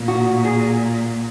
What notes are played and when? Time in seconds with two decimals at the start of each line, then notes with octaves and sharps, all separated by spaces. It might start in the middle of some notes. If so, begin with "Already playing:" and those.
Already playing: A#2
0.08 F#4
0.45 G#4